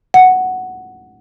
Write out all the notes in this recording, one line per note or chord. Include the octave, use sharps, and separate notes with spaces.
F#5